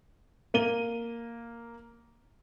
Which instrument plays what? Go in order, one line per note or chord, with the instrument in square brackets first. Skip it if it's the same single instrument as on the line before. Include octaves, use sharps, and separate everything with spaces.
[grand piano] A#3 D#7 G7